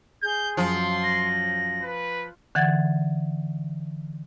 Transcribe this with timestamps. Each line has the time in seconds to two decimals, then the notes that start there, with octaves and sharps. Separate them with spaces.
0.23 G#4 G6
0.57 F#2 F3 F#3 C6
1.03 A#6
1.82 B4
2.55 D3 E3 F#5 G#6 A6